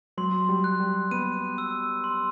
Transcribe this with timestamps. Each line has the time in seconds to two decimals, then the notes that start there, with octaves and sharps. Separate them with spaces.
0.17 F#3 C6
0.49 G3
0.64 F#6
0.80 G3
1.11 B3 D#7
1.58 E6
2.04 C6